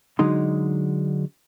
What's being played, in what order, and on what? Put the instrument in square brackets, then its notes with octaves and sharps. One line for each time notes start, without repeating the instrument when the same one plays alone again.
[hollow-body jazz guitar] D3 F#3 G#3 D#4 C6